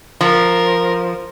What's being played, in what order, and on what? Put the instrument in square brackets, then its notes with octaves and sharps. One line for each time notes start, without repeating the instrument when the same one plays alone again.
[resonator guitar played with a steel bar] F3 [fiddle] A#4